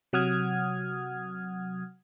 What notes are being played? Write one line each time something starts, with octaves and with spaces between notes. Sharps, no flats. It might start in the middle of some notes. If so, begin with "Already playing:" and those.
C3 F#3 F#5 D#6 F6 G#6